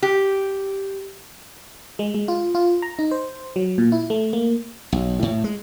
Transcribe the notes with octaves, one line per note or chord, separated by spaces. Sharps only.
G4
G#3
G#3
F4
F4
A#5
D#4
C5
F#3
A#2
E4
A3
A#3
B1
A2
G#3